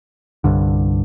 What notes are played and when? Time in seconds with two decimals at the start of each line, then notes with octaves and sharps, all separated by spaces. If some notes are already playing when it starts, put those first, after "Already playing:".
0.44 C2 G2 D3